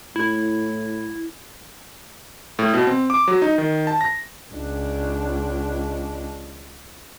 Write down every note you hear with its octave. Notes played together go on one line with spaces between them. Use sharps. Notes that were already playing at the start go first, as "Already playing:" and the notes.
A2 E4
A2
B2
C4
D6
F#3
D#4
D#3
A5
A#6
C#2 D4